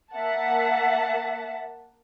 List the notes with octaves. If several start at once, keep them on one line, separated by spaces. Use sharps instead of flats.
A#3 E5 F#5 A5